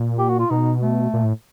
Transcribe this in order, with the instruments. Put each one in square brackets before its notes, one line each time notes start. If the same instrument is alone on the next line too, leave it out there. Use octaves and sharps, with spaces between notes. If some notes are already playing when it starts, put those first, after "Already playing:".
Already playing: [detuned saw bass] A#2
[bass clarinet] G4
F#4
F4
[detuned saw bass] B2 [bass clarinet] D#4
[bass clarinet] A3
[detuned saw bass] A#2
A2